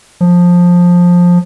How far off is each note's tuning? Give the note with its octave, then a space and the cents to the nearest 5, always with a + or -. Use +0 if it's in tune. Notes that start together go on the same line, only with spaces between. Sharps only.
F3 +15